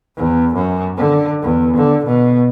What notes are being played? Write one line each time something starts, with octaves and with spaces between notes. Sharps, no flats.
E2
F#2
D3
E2
D3
B2